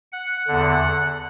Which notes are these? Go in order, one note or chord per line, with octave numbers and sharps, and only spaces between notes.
F#5
E2 D3 F#5